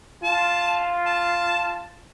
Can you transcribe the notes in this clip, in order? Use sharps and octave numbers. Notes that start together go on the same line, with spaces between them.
F4 A5
A5